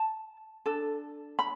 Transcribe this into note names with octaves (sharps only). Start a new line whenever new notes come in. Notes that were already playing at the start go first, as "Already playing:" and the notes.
Already playing: A5
D4 A4
B5